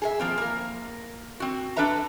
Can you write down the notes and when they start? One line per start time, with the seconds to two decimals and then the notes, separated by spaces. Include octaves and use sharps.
0.02 G#4 A4 E5
0.20 F3 A#3 C4
0.38 A#3 A#4
1.40 C4 F#4
1.76 D4 A4 B4 E5 A#5